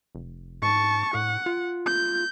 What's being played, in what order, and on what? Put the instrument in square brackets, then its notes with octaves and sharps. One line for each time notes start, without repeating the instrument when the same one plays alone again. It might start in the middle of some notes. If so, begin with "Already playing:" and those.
[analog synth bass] F1
[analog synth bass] G#2 [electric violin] A5 C#6
[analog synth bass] A2 [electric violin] F#5
[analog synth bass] F4
[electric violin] G6